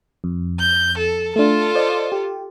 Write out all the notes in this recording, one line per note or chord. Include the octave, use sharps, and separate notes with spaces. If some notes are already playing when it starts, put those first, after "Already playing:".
F2
G6
A4
A3 D4 F4 A4
C5 D5 D#5
G4